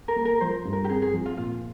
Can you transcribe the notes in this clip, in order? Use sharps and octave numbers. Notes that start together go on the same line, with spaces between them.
A#4
A#3
A#4
F3 C5
G2
A#4
G4
C4 G#4
G#4
F3
F4
A#2 F4